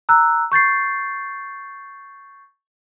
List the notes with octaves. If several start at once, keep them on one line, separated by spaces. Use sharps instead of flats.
A#5 E6 F#6
C#6 G6 A6 C7